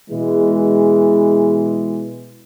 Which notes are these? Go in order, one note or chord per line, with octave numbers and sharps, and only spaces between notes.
B2 E3 G#3